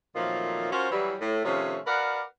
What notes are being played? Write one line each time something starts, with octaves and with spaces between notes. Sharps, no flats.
A#2 D#3 F3 F#3 A3 C4
C#4 F4 F#4 A#4 C5
E3 F#3 G3
A2
C3 D#3 F3 A3 C#4
F#4 A#4 B4 D5 F5 F#5